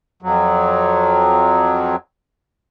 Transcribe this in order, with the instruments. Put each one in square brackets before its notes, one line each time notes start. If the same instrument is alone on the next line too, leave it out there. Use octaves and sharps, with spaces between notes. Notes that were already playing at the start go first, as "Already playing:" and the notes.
[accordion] F2 F#3